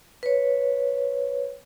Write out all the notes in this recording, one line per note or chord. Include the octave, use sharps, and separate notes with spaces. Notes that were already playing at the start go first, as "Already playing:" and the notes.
B4 C#5